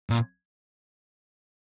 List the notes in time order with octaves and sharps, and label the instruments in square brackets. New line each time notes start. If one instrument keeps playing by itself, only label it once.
[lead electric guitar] A#2